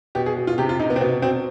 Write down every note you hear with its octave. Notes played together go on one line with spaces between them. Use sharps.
B2 G4
G#4
B2
F4
C3 G4
F4
C3 D#4
B3
C4
B2 B3
B2 C4